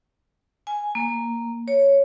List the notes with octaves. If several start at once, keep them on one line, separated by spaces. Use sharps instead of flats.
G#5
A#3
C#5